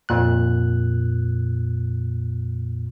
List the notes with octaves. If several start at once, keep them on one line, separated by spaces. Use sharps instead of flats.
F2 A#2 F#6